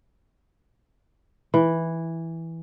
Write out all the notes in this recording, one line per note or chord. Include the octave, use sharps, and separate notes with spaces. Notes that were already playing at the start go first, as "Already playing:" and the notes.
E3